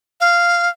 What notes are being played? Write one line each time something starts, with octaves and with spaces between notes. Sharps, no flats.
F5